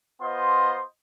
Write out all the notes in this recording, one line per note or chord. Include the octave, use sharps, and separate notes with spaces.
B3 F4 C5 D#5 C6